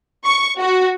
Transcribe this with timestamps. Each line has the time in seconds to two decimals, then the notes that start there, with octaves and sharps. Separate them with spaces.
0.24 C#6
0.60 F#4